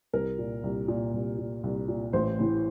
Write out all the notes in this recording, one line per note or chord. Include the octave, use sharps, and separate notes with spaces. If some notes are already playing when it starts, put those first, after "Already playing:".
C2 A#4
A#2
C2
A#2
C2
A#2
C2
A#2
A1 C5
A2 E3